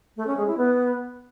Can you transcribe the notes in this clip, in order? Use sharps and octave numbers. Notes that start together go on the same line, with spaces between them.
A3
C#4
G#3
E4
B3